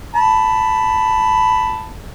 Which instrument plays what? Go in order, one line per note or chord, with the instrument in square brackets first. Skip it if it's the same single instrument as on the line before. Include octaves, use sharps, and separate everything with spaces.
[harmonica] A5 B5